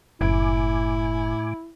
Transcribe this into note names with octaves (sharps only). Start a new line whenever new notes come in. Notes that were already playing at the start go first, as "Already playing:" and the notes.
F#1 A2 E4 G#5 D6